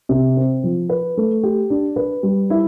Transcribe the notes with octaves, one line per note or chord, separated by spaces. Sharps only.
C3
C4
F3
B4
A3
G4
D4
B4
G3
E4